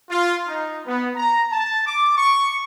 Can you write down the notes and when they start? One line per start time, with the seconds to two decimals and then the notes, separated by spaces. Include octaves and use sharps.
0.10 F4
0.47 D#4
0.87 B3
1.16 A#5
1.51 A5
1.87 D6
2.17 C#6